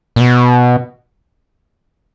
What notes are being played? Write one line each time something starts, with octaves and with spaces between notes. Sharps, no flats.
A#2
B2